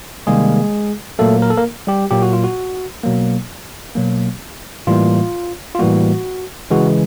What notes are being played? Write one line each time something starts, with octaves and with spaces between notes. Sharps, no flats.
C3 D#3 G3 G#3 A#3 G#4
A#2 F#3 A3 A#3 A4
A#4
A4
A#3 A#4
G3 G4
A#2 F#3 A#3 G4
F#4
F4
F#4
B2 F#3 A#3
B2 F#3 A#3
A2 E3 G3 A#3 F4
F4
A2 E3 G3 A#3 F#4
C#3 E3 G#3 F#4